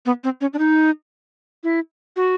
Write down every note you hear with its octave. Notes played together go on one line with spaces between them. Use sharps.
B3
C4
C#4
D4
D#4
E4
F#4